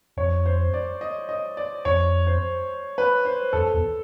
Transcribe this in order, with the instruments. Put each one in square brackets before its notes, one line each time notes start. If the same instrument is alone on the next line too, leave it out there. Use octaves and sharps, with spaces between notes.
[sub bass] F2 [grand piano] C#5
[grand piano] C5
D5
D#5
D#5
D5
[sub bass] F2 [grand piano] C#5
[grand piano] C5
B4
C5
[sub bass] F2 [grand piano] A4
[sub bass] E2